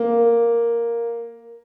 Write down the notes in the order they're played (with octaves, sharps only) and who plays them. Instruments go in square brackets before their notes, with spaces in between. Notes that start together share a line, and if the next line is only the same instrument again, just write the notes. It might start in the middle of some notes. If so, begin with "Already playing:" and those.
Already playing: [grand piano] A#3